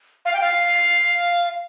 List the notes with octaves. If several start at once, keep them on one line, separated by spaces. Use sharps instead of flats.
F5
G5
F5